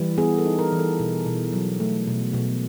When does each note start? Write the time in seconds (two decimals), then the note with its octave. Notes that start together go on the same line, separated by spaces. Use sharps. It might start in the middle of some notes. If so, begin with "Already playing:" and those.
Already playing: E3 G3
0.18 B3 G#4
0.38 A4
0.46 D#4
0.59 A#4
0.72 E3
0.79 A4
1.00 B2
1.26 B2
1.53 F#3
1.80 A3
2.07 B2
2.34 B2